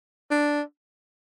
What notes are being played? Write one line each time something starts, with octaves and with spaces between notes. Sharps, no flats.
D4